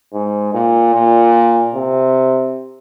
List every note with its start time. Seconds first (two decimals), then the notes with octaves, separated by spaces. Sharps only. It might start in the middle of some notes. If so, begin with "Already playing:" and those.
0.13 G#2
0.54 A#2
0.94 A#2
1.75 C3